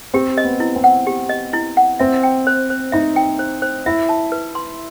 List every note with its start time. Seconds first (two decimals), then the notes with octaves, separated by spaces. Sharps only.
0.14 C4 G4
0.37 D#5
0.44 B3
0.60 E4
0.76 C4
0.84 F#5
1.07 G4
1.29 D#5
1.53 E4
1.77 F#5
1.99 C4 E5
2.23 G5
2.47 C5
2.70 C5
2.92 D#4 E5
3.16 G5
3.39 C5
3.62 C5
3.86 E4 E5
4.09 A5
4.32 B4
4.55 C6